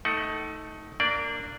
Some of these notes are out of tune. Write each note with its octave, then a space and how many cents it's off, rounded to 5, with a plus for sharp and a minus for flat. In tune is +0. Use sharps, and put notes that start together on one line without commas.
A3 +0 D#4 +20 F#5 +35
A#3 -25 D4 +0 D5 +0